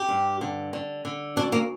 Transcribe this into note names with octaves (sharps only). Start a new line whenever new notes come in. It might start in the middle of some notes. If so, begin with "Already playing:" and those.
Already playing: G4
G2
D3
D3
D3
D2 D4
A#3